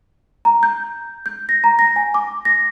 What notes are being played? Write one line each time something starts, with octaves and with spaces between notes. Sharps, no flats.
A#5
G6
G6
A#6
A#5
A#6
G#5
D6
A#6